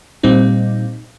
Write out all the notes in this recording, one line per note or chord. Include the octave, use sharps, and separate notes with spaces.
A#2 G3 C4 D#4